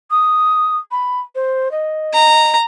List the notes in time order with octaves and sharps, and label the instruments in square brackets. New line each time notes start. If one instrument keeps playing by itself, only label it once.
[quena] D#6
B5
C5
D#5
[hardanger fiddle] A#5